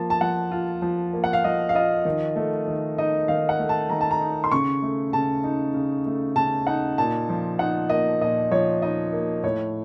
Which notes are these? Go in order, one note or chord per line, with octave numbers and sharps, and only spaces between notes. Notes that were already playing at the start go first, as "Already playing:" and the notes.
Already playing: F3 A#3 A5
A5
F3 F#5
F4
F3
A#3
F#5
F5
F3 D#5
F5
F4 D#5
D#3
A3
D#3
D#4 D#5
D#3 F5
F#5
A3
A5
D#3 A#5
A5
A#5
D#4
C6
C#3 C#6
A3
C#3 A5
D#4
C#3
A3
C#3 A5
D#4 F#5
A#2 A5
F3
D#4 F#5
A#3 D#5
A#2 D#5
F3 C#5
D#4 D#5
A#3
A2 C#5